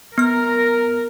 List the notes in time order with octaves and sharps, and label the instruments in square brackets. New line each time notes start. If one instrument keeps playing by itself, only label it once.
[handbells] B3 F6 [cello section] A#4